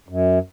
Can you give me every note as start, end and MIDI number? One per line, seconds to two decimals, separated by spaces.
0.09 0.39 42